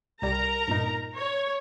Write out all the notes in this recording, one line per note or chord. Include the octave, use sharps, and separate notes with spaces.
C2 G3 A#4 A#5
G2 A#2 D#4
C#5